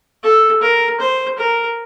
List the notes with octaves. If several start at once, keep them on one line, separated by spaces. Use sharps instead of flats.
A4
A#4
C5
A#4